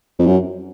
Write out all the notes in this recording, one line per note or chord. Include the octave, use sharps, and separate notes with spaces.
F2
F#2